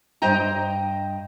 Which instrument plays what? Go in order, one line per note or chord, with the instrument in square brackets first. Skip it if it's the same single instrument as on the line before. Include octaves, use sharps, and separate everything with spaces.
[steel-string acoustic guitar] G2 C5 D#5 G5 A#5